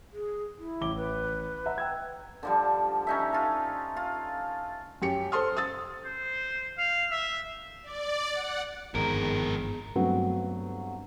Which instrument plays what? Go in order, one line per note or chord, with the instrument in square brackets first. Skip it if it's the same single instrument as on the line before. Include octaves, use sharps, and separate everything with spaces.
[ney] G#4
E4
[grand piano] A1 D6 G7
[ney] B4
[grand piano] E5 F#5 A#5
G5 E6 G#6
[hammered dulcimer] D3 F3 G3
C#4 D#4 E5
F4 A4
F4
[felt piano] F#2 G4 C#7
A4 C5 A5 C6 D#6 F6
D#6 E6 A6
[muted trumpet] C5
F5
E5
[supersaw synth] D5
F#5
[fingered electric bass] G1 G#2 [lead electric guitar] F2 A#4 [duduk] D#3 [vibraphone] B3 G#4 A#5
[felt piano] G2 F#3 A3 B3 C4